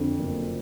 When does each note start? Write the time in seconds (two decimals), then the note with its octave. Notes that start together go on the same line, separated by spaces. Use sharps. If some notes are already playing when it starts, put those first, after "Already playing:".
Already playing: F2 D3
0.19 F#1